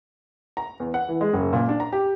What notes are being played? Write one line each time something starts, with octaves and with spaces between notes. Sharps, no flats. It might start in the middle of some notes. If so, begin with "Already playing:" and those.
A#5
E2
F#5
E3
G#3
F#1
A#2
D4
A#5
G4